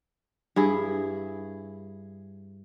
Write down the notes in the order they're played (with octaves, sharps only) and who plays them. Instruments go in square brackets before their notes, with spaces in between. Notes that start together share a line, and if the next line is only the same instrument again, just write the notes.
[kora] G2 E4 G#4